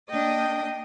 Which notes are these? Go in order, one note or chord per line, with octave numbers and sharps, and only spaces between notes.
A#3 D4 D#5 G5 D#6